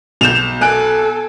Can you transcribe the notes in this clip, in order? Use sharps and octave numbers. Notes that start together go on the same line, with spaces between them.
B1 G6 E7 F7
A4 G#5 F#6 D7